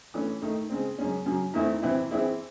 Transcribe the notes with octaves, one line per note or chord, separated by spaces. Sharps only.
E3 A3 C#4
D#3 A3 D#4
C#3 G#3 C4
F#2 C#3 G#3 C#4
F#2 C#3 F#3
E2 D#3 A3 C4 E4
C3 E3 C4 E4
E3 C4 E4 G#4